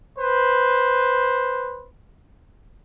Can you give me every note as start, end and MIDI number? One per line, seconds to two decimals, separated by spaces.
0.18 1.87 71
0.18 1.87 72